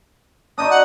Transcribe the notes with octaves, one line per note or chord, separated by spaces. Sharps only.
D4 D#4 C#6 D#6
F#5